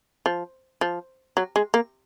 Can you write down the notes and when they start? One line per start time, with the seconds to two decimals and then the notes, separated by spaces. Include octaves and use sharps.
0.26 F3
0.81 F3
1.37 F#3
1.56 G#3
1.74 A#3